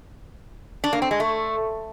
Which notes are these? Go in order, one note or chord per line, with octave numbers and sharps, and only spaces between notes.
D4
A#3
C4
G#3
A3